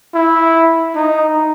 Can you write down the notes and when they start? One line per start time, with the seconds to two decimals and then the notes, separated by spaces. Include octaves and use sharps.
0.14 E4
0.95 D#4